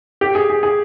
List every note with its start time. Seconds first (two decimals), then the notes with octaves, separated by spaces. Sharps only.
0.21 G4
0.35 G#4
0.50 G#4
0.63 G#4